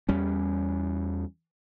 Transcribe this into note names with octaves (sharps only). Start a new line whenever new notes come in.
E2 G3 C#4